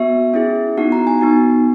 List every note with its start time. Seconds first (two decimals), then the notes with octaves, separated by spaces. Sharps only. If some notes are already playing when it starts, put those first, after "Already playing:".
Already playing: B3 F#4 E5
0.34 C#4 E4 G#4
0.77 B3 D#4 F#4 F#5
0.92 A#5
1.07 G#5
1.21 B3 D#4 F#4